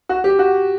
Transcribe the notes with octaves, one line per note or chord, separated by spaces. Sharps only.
F#4
G4
F#4